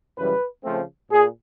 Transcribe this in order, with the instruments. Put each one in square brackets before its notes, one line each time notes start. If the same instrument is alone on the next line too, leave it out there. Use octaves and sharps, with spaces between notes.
[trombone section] F#2 C#3 E3 G3 B4
C#3 F3 A3 C4
A#2 G#4